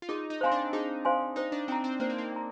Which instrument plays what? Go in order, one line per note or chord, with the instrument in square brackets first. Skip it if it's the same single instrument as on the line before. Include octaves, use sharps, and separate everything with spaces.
[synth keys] F4
[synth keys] D#4 [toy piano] G#4
[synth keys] D#4
[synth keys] C4 [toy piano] C5 F5 G#5 C6
[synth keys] D4
[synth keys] D#4 [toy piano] G#4
[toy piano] C5 F5 G#5 C6
[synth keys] D#4 [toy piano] C5
[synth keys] D4
[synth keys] C4 [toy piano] G5 A#5
[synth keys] C4
[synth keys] A#3 [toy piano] C5
[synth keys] C4
A#3
[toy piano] G5 A#5